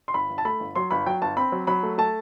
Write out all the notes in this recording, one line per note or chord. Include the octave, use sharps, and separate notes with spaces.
C6
G1 B5
G1
A5
A3 B5
G1
F#3 C6
G1 B5
F#3 G5
G1 A5
C4 B5
F#3
F#3 B5
A3
A3 A5